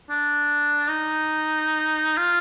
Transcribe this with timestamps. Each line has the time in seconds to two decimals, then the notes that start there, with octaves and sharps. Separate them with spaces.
0.10 D4
0.89 D#4
2.17 F4